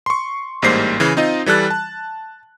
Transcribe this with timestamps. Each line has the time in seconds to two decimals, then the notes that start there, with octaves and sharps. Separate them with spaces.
0.06 C6 C#6
0.62 A1 G#2 G3 A#3 C5 C7
1.00 C#3 E3
1.17 C4 D#4 F4 D#5
1.46 E3 G3 A4 F#6 A6
1.70 A5